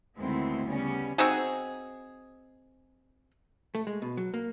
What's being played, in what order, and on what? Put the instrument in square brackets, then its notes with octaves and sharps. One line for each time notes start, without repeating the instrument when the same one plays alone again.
[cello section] D2 D#3 G#3 B3 C4 E4
C#3 G3 B3 C#4
[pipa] C4 D#4 F#4 G#4
[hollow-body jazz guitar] A3
G#3
B2
F#3
A#3